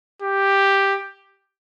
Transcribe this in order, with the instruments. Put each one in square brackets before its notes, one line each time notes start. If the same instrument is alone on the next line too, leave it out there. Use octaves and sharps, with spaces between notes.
[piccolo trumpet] G4